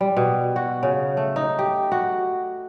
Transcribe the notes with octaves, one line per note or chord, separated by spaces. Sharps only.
G3
B2
F#4
C#3
A3
D#4
G4
F#4